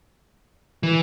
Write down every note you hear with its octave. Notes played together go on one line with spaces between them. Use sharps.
E3